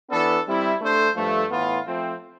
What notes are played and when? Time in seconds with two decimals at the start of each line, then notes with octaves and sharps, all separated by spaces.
0.10 E3 B3 D4 A4
0.46 G3 C4 E4
0.81 A3 D4 A4 C5
1.16 G2 F3 A3
1.51 A2 E3 B3 F4
1.86 F3 A3 C4